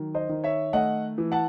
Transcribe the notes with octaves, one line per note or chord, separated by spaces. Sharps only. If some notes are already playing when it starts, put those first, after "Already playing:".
Already playing: D#3 F#3
C5 D#5
D#3
C#5 E5
A3 D#5 F#5
E3
F#5 A5